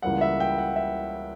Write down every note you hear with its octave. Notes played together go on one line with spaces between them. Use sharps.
C#2 C#3 E3 G3 A#3 F#5
E5
G5
F#5
E5